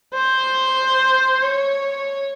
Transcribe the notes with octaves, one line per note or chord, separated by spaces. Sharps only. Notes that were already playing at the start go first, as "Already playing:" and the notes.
C5
C#5